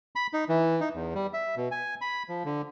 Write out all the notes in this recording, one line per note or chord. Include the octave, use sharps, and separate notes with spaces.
B5
D#4
E3
D#4
E2
G3
E5
B2
G#5
B5
F3
D3